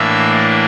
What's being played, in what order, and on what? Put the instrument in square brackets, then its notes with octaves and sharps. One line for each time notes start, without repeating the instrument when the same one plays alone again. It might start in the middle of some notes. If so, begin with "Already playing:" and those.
Already playing: [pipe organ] A2 E3 A#3 D4 E5